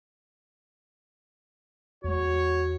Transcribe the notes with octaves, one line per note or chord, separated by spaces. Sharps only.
E2 G#3 F#4 C#5